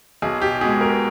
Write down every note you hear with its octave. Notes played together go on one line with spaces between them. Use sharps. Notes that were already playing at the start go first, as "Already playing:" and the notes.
B1 G#4
G4
B2 G#3 G#4
A#4